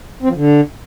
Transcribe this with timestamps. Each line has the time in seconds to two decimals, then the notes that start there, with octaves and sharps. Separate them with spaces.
0.22 C4
0.29 F3
0.36 D3